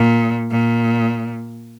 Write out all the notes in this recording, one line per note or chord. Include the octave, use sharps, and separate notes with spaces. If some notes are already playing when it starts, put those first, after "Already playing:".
Already playing: A#2
A#2